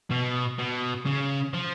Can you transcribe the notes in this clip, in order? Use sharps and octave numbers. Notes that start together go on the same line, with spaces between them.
B2
B2
C#3
F3